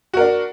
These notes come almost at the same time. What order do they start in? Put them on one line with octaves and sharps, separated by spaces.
F#4 A#4 D4